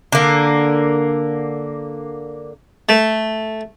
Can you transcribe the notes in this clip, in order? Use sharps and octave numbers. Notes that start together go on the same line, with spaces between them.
D3 A#3
A3